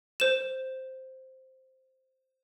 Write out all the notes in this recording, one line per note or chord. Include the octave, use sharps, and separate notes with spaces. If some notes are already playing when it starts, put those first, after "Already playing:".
C5 E7